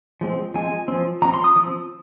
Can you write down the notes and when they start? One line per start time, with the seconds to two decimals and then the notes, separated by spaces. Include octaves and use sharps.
0.21 F3 G#3 C4
0.54 F3 G#3 C4 G#5
0.88 F3 C4
1.22 F3 A#5
1.25 C4
1.34 C6
1.44 D#6
1.56 F3 C4